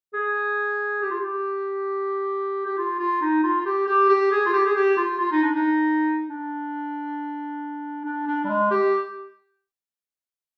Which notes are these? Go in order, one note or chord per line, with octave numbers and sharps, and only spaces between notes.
G#4
G4
F4
G4
G4
F4
F4
D#4
F4
F4
G4
G4
G4
G#4
F4
G4
G#4
G4
F4
F4
D#4
D4
D#4
D4
D4
D4
G3
G#3
G4